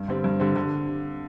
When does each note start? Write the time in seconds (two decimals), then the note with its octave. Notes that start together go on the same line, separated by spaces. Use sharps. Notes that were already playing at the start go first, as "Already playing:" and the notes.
Already playing: G2
0.08 D3 G3 C4
0.24 G2
0.40 D3 G3 C4
0.56 D3